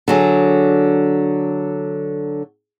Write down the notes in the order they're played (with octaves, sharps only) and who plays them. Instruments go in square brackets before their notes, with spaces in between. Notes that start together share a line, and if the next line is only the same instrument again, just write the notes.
[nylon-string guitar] D3 F#3 G#4